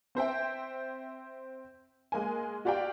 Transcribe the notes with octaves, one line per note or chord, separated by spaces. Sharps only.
C4 C5 E5 G5
G#3 A#3 G#5
F#4 G4 D5 F5 G5